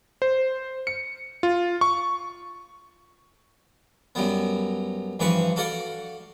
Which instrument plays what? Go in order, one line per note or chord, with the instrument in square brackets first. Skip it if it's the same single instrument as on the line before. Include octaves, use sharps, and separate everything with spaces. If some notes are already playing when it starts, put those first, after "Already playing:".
[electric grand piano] C5
C#7
F4
C#6
[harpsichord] F#2 F#3 G3 B3
G2 E3 F3 B4 B5 C#6
F#4 A4 D5 F5 F#5